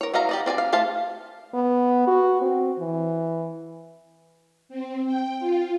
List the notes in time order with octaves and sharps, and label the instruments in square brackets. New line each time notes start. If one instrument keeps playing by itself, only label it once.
[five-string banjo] A#4 C#5
E3 F#4 D#5 F5 A#5
G4 D5 D#5
C4 D5 D#5 G#5
F5
A3 C5 F5 A5
[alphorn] B3
F#4
C4
E3
[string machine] C4
G5
F4